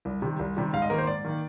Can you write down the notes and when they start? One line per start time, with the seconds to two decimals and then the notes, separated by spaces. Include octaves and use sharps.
0.05 C2
0.22 C3 D#3 G3
0.39 C2
0.57 C3 D#3 G3
0.73 G#2 F5
0.82 D#5
0.90 D#3 A#3 A#4
0.98 C5
1.07 G#2 D5
1.24 D#3 A#3